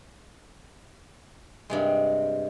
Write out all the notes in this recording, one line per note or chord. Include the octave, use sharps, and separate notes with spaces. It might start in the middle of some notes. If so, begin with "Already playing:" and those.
G2 C3 G#3